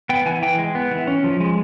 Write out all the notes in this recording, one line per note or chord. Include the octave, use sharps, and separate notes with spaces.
B3 G5
E3 G#5
E3 G5
G#3
B3
E3
C#4
F3
G#3